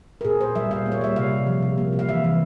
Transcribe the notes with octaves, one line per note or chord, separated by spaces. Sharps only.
A#4
A#2 G#4
A#2 C5
G3 E5
A#2 F5
A#3
C#5
G3 E5
C3 F5
C3
F3
C3
A#3
C3
F5
E3 E5
E3